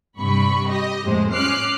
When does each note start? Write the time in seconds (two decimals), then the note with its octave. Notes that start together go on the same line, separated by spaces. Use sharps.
0.20 G2 C3 B5 C#6
0.68 G4 D#5
1.04 F2 A2 G#3 C5
1.33 C#4 D6 F6 F#6 C7